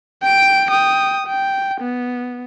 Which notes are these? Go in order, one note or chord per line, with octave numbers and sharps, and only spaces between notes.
G5 D7
G5 D#6
G5
B3